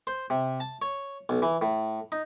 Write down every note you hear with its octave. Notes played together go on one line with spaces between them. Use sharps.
C5
C3
A5
C#5
B1
E3
A2
D#4